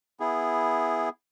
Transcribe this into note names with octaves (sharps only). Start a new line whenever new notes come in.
B3 E4 G#4